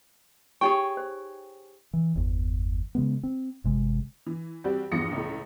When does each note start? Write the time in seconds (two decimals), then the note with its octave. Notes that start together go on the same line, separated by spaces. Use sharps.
0.61 D#4 G4 G#4 C#5 G5 C#6
0.97 C5
1.93 E3
2.15 G1 E2
2.95 C#3 G#3 B3
3.23 C4
3.64 G1 C3 G#3
4.26 E3
4.64 G3 C4 F#4 G4
4.91 E2 G2 F3 D#6 A#6 C#7
5.12 C#2 A2